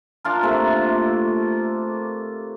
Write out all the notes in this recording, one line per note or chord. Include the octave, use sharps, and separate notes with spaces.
D4 F4 A#4
C3 A3 A#3